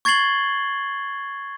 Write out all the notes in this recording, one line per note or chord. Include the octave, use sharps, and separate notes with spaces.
C#6 G#6 A6 C7 F#7 G7